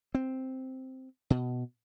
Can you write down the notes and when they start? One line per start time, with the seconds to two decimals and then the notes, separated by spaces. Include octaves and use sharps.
0.15 C4
1.30 B2